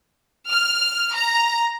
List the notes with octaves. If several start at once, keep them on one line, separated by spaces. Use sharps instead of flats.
F6
A#5